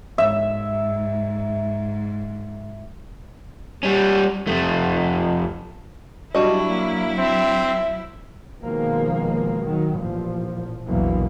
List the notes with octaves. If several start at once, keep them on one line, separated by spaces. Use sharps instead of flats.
G#2 E5
G3 C#4
F2 A3
F#3 G3 D4 E4 F#4 D#5
A#3
C4 E5
B2 D#3 F3 G#3 A#3
D#3 F#3
A1 A#2 F3
A#1 E2 B2 E3 F#3 A#3